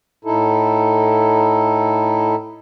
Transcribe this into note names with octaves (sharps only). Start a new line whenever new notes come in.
A2 D#4 E4 A4